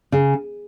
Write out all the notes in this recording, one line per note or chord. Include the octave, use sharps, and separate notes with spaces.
C#3